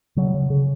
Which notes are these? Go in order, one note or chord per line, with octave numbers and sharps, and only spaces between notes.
C#3 F#3
C#3
C#3